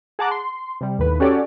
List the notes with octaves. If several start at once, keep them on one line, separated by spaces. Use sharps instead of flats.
G#4 F#5 A5 A#5 D6 F#6
C6
C3 G3
D#2 A2 B4
C#4 F#4 G4 A4 C#5 D5